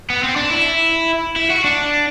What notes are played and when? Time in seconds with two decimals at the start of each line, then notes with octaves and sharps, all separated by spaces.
0.10 B3
0.23 C4
0.36 D4
0.50 E4
1.36 E4
1.50 F#4
1.64 D4